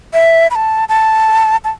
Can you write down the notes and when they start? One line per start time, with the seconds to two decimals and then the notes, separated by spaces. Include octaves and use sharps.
0.13 E5
0.51 B5
0.55 A5
0.89 A5
1.64 A5